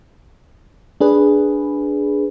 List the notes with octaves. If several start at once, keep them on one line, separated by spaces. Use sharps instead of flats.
D4 G#4 B4